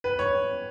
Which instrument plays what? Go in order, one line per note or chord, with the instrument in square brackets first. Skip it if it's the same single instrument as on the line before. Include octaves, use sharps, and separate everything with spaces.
[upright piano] B4
C#5